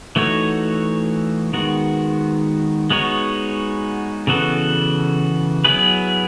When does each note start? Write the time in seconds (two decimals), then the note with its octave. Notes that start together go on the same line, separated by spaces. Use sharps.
0.16 E3 A3 D#4 F#4 C#5
1.53 D#3 G#3 B3 F#4
2.90 G#3 B3 D#4 F#4 C#5
4.27 C#3 E3 B3 F#4 A4
5.65 F#3 B3 E4 G#4 B4